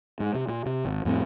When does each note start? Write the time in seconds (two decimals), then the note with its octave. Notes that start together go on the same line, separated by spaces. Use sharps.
0.20 G#2
0.35 C3
0.49 A#2
0.66 C3
0.85 G#1
1.05 F2 A2 B3 C4